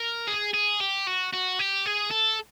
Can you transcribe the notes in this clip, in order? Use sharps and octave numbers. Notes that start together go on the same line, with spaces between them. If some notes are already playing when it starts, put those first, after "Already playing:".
Already playing: A#4
G#4
G#4
G4
F#4
F#4
G4
G#4
A4